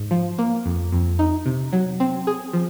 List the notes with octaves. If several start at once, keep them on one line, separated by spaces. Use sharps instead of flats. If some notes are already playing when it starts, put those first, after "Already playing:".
Already playing: G#2
F3
A#3
F2
F2
D#4
C3
F#3
C4
G#4
F3